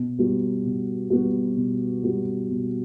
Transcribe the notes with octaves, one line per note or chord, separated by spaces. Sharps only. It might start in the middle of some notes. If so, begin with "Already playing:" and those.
Already playing: B2
G3 B3 F#4
B2
G3 B3 F#4
B2
G3 B3 F#4
B2